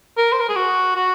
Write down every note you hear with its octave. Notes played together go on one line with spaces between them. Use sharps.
A#4
C5
A#4
G#4
F#4
F#4